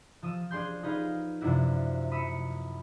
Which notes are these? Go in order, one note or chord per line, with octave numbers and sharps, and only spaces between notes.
F3 D#6 E6
D4 G#4 C6 G6
D#4 G#4 B4 F5
F#2 C3 F3 D4 E4 F#4
B5 D#6 E6 B6 C#7